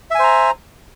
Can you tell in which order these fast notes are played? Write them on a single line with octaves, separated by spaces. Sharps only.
E5 G#5 C5 A#5